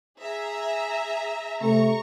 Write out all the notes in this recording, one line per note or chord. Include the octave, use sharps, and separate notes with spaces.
G#4 E5 A#5
C3 A3 A#5 C#6